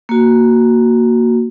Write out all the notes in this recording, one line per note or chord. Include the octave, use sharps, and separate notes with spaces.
A#3 F#4